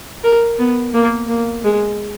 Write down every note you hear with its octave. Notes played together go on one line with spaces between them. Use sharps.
A#4
B3
A#3
A#3
G#3